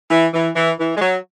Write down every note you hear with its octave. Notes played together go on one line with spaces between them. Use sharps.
E3
E3
E3
E3
G#3
F#3